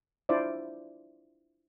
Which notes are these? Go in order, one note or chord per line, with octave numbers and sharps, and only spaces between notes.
D4 E4 F4 C5 D5